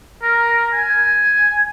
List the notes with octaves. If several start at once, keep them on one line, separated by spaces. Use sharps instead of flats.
A#4
G#5